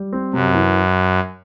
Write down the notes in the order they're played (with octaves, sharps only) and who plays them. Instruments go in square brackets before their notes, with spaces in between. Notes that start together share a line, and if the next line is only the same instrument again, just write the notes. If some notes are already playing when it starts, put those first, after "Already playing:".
Already playing: [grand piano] G3
C4
[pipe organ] F#2 [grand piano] C3
[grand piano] E3